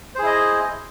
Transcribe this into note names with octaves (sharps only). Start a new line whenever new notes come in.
E4 G#4 C5 D#5